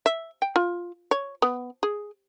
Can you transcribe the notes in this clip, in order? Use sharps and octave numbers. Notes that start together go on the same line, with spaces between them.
E5
G5
F4
C#5
B3
G#4